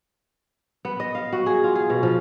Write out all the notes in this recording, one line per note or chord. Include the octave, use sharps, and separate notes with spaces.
B3
D#5
F5
F#4
G#4
F4
G#4
B2
F3